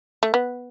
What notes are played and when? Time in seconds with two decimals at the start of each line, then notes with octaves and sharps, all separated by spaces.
0.23 A3
0.34 B3